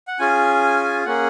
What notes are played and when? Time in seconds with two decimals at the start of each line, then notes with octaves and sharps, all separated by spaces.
0.08 F#5
0.19 C#4 F4 G#4 G#5
1.05 A#3 C#4 G#4 F#5